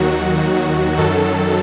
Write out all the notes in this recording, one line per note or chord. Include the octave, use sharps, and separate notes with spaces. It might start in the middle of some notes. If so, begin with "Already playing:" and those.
Already playing: D#2 D#3 F#3 F#4
F#2 D#3 F#3 A4